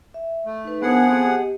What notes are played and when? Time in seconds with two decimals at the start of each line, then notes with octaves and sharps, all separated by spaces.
0.14 E5
0.46 A3
0.65 D#4 B4
0.82 F3 B3 D4 G#4 A#4 F#5
1.09 B3 C4 A4
1.25 G4 D#5